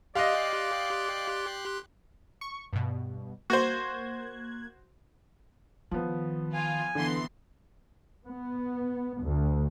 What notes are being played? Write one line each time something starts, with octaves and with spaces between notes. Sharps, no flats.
G4 D5 D#5 F5 C6 F#6
C#6
G2 B2
A#3 F#4 C5 F#6 G#6
D#3 F3 B3
F4 G#5
D3 E3 B3 C6
B3
D2